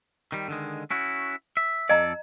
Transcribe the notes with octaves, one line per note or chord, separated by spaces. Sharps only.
D#3 G3
D3 D#3 G#3
C#4 E4 F#4
E5
F2 A4 D5 D#5 A#5